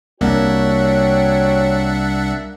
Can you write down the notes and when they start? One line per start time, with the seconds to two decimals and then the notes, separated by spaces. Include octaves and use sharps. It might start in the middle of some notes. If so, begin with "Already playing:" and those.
0.21 C2 A#3 D4 F#4 C#5 E5 F#5 G5